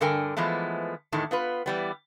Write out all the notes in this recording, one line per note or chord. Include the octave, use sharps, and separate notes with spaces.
G2 D3 A4 A#4 G5 G#5
E3 F3 G#3 A3 B3
E2 A2 D#3 G#3 A3
B3 F4 B4
E3 G3 B3